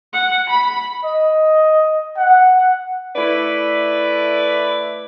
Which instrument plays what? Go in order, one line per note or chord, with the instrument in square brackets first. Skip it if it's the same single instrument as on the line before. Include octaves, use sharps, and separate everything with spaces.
[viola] F#5
B5
[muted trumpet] D#5
F#5
[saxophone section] A3 E4 B4 D5